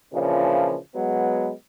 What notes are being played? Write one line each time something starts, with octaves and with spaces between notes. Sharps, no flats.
A#2 C#3 E3 F3 D4
F#3 G#3 B3